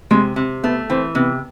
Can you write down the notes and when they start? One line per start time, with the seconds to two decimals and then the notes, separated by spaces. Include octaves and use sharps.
0.11 C3 G#3
0.36 C3
0.64 A3 B3
0.90 E3 C4
1.15 C3 B3